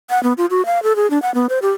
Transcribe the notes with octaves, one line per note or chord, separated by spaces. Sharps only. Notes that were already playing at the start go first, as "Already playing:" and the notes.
F#5
B3
F4
F#4
F5
A4
G#4
D4
F#5
B3
C5
G4